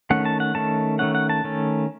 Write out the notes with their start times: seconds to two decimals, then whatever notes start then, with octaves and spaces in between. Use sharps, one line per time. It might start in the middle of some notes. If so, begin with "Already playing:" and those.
0.10 D#3 A3 C#4 F#5
0.25 A5
0.40 F#5
0.55 D#3 A3 C#4 A5
0.99 D#3 A3 C#4 F#5
1.15 F#5
1.29 A5
1.44 D#3 A3 C#4